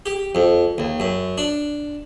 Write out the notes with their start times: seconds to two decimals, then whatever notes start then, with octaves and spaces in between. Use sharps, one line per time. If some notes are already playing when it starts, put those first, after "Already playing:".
0.06 G4
0.35 F2
0.78 D#2
1.00 F#2
1.38 D4